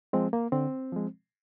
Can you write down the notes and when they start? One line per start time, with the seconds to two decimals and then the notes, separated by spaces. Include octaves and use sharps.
0.13 F3 G#3 C4
0.33 A#3
0.52 D3 C4
0.92 F3 G#3